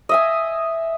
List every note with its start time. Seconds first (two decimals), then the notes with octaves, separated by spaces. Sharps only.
0.09 D#5 E5 G#5